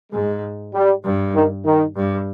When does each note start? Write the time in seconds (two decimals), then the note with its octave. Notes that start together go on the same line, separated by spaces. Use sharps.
0.12 G#2 G#3
0.74 G3
1.04 G2
1.35 D#3
1.65 D#3
1.96 G2